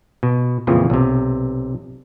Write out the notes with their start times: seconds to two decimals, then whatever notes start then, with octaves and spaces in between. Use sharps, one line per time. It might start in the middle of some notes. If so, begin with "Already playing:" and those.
0.23 B2
0.67 F2 A#2 C#3 E3 F3
0.90 B1 C3